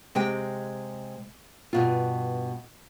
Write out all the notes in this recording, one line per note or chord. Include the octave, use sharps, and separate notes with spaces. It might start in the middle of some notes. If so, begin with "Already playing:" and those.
C3 G#3 G4 G5
G2 B2 F4